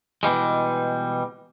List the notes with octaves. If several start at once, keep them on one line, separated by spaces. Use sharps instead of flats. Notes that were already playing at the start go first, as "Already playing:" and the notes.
B2 E3 G3 G#3